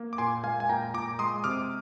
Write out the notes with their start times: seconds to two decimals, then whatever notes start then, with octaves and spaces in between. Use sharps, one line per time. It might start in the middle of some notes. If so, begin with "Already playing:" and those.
Already playing: A#3
0.13 D6
0.18 A#2 G#5 C6
0.44 G#3 F5 G#5
0.60 G#5
0.69 A#2 G5 A#5
0.94 A#2 A#5 D6
1.19 G#3 C6 D#6
1.44 C3 D6 F6